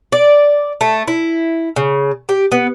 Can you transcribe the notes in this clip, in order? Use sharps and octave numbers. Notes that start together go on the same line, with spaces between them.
D5
A3
E4
C#3
G4
B3